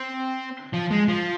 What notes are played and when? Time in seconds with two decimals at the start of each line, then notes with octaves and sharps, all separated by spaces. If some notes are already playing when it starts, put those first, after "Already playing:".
Already playing: C4
0.74 F3
0.91 G#3
1.08 F3